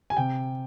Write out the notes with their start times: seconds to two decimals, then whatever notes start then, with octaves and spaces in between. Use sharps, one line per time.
0.10 G#5
0.17 C3 G5